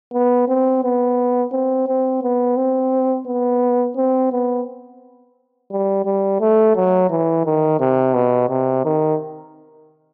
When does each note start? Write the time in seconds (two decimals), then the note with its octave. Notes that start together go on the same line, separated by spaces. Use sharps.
0.13 B3
0.48 C4
0.84 B3
1.52 C4
1.88 C4
2.23 B3
2.57 C4
3.26 B3
3.97 C4
4.32 B3
5.71 G3
6.05 G3
6.40 A3
6.76 F#3
7.10 E3
7.45 D#3
7.80 C3
8.14 B2
8.49 C3
8.84 D#3